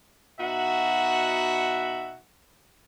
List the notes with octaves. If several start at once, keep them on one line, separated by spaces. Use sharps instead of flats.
B2 D#4 F#4 E5 F#5